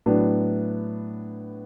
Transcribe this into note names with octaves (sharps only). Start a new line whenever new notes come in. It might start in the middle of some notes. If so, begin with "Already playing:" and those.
A2 F#3 B3 D4